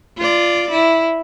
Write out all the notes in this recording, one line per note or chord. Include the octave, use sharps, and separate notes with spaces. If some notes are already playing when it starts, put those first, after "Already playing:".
F4 D5
E4